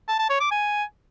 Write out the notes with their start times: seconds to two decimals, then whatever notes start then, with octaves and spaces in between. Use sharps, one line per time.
0.08 A5
0.19 A5
0.30 C#5
0.40 D6
0.51 G#5